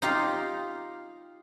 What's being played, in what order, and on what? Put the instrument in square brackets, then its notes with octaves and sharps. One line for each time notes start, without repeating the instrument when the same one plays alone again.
[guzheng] D#4 F4 G4 F5